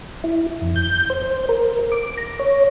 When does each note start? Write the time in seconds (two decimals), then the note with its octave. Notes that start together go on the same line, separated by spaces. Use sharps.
0.24 E4
0.61 F2
0.76 G6
1.10 C5
1.49 A#4
1.92 D6
2.18 A#5
2.39 C#5